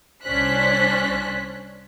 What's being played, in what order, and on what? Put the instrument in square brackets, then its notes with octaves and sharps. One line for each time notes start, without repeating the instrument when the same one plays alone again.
[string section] C2 C#4 D4 C5 F#6 B6